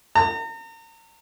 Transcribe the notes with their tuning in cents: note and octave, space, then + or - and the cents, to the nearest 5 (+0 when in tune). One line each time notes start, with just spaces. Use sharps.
A#5 -40